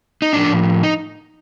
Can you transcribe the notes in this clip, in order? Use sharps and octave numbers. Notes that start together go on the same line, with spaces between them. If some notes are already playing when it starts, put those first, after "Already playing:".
D#4
A2 F3 D4
D#4